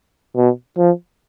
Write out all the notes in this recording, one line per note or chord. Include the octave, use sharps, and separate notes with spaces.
B2
F3